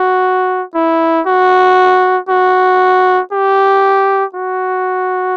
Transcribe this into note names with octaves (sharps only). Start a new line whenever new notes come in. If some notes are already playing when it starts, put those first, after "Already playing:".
Already playing: F#4
E4
F#4
F#4
G4
F#4